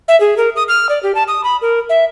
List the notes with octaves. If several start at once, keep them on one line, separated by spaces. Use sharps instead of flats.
E5
G#4
A#4
D#6
F6
D5
G4
A5
D#6
B5
A#4
E5